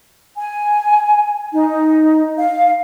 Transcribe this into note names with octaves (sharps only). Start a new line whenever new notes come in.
G#5
D#4
F5